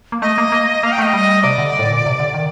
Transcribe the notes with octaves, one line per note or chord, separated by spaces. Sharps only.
A#3
A3 D#5
A#3
A#3
A#3 F5
G5
A3 D#5
G3
C3 D5
D3
A2
A#2
C3
D3
D#3